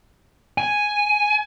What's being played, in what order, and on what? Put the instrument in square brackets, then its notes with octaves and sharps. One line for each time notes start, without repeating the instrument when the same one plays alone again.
[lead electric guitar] G#5